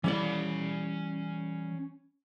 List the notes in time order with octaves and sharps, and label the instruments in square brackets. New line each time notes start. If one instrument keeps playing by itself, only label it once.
[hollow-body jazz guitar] E3 G3 D5 [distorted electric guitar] C#4 B5